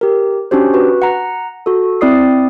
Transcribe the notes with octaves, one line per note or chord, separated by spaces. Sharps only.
G4 A#4
C#4 D4 F#4 G4 C5
F#4 B4
F#5 A#5
F#4 A4
C4 E4 D5 D#6 C7